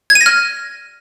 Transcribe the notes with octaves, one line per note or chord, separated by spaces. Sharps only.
G#6
D#7
A#6
F6